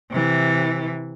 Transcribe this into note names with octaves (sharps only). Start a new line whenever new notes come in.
C3 E3